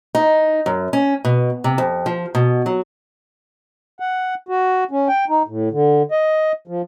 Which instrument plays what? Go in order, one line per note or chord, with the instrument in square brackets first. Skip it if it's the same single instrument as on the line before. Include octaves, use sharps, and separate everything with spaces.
[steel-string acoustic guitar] D#4
F#2
C#4
B2
C3
F2
F3
B2
F#3
[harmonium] F#5
F#4
C#4
G5
D#4
A2
D3
D#5
F3